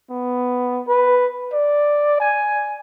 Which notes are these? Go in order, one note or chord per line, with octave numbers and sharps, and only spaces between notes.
B3
B4
D5
G#5